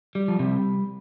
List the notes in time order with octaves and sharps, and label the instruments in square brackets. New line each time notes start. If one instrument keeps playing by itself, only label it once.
[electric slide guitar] G3
F3
C3 G3